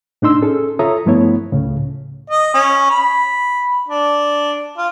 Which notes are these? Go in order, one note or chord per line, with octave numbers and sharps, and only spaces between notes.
A2 D4 D#4 C6 E6
C#4 G#4 A4
F4 A4 C#5 E5 A#5 D#6
G2 F3 A3 B3 E4 C#5
C#2 A2 C#3
D#5
C#4
B5
D4
F4